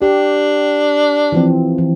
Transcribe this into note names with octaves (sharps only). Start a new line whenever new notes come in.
D4 G4
E3 F3 C4
E3